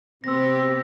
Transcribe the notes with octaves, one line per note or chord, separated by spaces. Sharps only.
C3 B3 C4 G4 E6 A#6